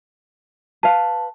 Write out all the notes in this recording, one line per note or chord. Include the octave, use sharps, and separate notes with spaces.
B4 F5 A5